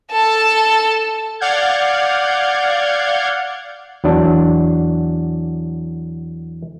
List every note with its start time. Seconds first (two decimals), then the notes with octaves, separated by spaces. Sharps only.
0.11 A4 A5
1.40 D5 F5 F#5 F6 G6 G#6
4.04 E2 F#3 D4